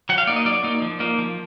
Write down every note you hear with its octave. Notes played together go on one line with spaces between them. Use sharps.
F#3 F#5
F5
A#3 D#4 D5
D#5
F#3 D5
A#3 D#4
F3
A#3 D#4
F3